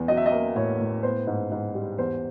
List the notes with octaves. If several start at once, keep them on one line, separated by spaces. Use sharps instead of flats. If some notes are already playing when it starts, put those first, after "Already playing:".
Already playing: E2
F#3 D#5
E5
D#5
A#3
A2 C#5
A2
B3 C5
G#2
G#2
G3
E2 C5